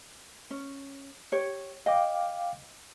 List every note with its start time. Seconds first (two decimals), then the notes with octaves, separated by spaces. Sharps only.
0.50 C#4
1.32 G4 C#5
1.86 D#5 F5 G5 D6